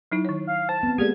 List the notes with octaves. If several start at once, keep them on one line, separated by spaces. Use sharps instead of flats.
F#3 D#4 E4
D#3 C#5
F5
C5 A5
B3 C4
G#3 A#3 G4 G#4 D5 G#6